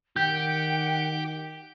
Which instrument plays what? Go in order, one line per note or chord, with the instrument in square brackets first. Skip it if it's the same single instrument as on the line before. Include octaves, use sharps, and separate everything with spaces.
[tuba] D#3 [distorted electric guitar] G4 [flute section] F#5 G5 [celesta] G6